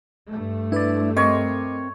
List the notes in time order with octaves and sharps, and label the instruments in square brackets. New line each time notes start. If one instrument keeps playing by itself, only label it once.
[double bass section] G2 A3
[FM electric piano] D4 B4 [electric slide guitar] E4 D5
[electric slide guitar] C4 A#4 [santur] C#5 [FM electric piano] D#5 C6 D6